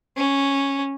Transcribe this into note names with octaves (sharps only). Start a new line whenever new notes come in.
C#4